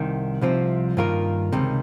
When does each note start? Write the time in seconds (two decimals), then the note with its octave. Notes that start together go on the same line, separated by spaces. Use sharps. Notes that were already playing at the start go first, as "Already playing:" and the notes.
Already playing: C2 C3 D#3
0.41 C2 C3 F3 C4
0.97 G2 D#3 A#3 F4 A#4
1.52 C#2 C3 D#3